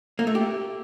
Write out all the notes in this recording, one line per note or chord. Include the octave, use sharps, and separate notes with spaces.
A#3
A3
G4